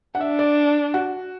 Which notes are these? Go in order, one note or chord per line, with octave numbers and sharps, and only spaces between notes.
F#5
D4 E5
D5
F#4